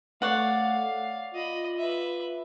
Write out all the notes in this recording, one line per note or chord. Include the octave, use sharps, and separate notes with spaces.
A3 C#5 D5 F5 F#5
F4 D#5 B5
B4 E5